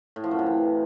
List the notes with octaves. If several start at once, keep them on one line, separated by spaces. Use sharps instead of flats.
A2
F3
F#2
C3
E3